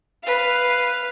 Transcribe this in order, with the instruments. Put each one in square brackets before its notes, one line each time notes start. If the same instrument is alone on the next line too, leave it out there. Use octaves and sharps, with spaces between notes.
[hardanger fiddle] B4 F5